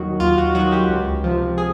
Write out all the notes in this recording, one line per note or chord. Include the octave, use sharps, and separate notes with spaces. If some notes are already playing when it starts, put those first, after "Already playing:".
Already playing: D#2 D#3 F#3 F#4
D#2 F4
F#4
D#3 F#3 F#4
G4
C#2
C3 F3
G#4